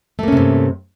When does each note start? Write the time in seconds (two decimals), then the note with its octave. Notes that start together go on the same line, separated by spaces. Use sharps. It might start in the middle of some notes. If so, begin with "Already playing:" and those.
0.19 A3
0.23 A#3
0.28 C#4
0.32 C3
0.37 G2